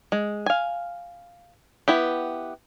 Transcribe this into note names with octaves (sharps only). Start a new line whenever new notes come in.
G#3
F5 G#5
B3 E4 G4